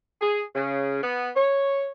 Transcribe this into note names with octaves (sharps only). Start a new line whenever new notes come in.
G#4
C#3
B3
C#5